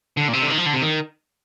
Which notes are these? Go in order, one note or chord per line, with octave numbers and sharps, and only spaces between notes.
D3
A#2
C3
D3
D#3
F3
D3
C3
D#3